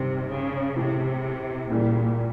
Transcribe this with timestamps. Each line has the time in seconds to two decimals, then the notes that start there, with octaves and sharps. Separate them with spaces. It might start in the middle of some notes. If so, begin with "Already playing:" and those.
Already playing: G2 C3 D#3 G3
0.29 C#3
0.76 A2 C3 E3 G#3
1.70 C#2 A#2 C#3 E3 G3 A#3